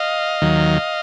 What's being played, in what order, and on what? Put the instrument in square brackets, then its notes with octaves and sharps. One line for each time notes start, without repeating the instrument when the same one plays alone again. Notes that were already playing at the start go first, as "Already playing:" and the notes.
Already playing: [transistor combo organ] D#5 F5
D#2 D#3 F#3